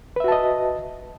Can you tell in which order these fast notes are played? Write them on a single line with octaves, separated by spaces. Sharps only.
B4 E5 F#4 A5 D#5